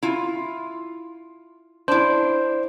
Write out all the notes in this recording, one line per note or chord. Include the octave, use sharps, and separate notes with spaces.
E4 F4
D4 E4 C5